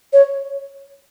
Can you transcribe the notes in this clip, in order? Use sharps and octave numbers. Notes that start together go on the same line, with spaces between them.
C#5